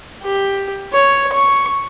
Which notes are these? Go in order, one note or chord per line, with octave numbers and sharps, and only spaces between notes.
G4
C#5
C#6